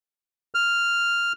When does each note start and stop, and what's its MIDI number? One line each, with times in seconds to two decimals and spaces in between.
0.55 1.33 89